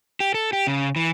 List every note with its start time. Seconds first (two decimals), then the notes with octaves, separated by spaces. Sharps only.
0.20 G4
0.34 A4
0.53 G4
0.67 C#3
0.96 E3